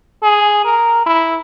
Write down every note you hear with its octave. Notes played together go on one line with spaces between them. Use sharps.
G#4
A#4
E4